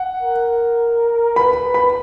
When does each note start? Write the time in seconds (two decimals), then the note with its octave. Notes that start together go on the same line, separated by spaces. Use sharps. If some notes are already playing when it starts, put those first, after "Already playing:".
Already playing: F#5
0.22 A#4
1.36 B4 B5
1.74 B5